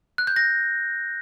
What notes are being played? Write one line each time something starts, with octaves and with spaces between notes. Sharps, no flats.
F#6
G6
A#6